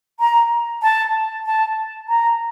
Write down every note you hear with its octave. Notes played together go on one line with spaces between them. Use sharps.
A#5
A5
A5
A#5